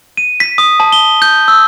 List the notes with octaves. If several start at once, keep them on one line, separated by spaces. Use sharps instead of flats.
D#7
B6
D#6
A5
G7
G6
E6